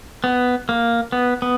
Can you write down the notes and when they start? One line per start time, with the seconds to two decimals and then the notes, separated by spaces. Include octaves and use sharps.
0.24 B3
0.69 A#3
1.12 B3
1.42 B3